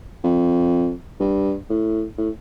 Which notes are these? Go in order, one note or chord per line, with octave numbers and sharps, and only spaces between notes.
F2
G2
A2
A2